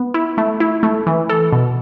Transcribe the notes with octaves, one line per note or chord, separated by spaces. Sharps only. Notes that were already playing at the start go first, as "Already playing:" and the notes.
Already playing: B3
E4
A3
E4
A3
E3
A4
B2